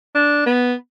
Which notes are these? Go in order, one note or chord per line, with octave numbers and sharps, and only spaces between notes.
D4
B3